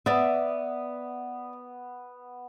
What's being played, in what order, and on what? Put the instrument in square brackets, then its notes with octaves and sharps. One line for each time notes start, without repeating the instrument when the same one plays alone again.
[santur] B3 [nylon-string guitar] D5 E5